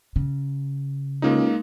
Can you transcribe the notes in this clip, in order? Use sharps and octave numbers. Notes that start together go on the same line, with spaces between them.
C#3
C#2 G#3 A#3 D#4